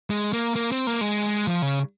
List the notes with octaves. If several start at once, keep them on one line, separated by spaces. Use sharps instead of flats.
G#3
A#3
A#3
C4
A#3
G#3
F3
C#3